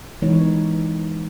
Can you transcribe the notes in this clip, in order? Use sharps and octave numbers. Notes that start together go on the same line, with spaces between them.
E3 G#3 B3 D#4 B4 C#5